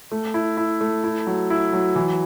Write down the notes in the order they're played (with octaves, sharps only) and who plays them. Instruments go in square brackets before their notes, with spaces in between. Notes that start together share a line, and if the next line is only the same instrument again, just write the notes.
[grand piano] A3
E4
E4
A3
E4
F#3
E4
F#3
E3